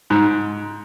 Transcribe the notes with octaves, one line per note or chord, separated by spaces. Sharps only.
G#2